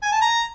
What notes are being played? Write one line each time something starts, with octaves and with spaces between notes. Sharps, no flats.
G#5
A5
A#5